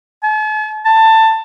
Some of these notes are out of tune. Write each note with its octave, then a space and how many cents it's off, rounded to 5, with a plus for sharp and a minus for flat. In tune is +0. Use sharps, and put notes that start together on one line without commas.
A5 -45
A5 +15